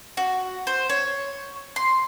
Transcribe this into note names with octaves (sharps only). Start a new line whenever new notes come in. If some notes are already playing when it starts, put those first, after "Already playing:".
F#4
C5
C#5
C6